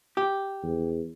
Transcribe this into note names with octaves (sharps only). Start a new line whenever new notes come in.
G4
E2